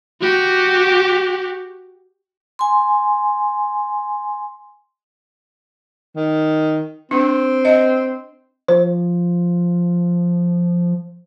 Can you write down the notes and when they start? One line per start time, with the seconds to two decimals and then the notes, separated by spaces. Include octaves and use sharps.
0.22 F#4 G4
2.59 G#5 C6
6.15 D#3
7.11 C4 D4
7.65 D#5
8.68 F3 C5